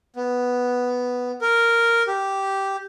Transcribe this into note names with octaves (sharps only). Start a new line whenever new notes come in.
B3
A#4
G4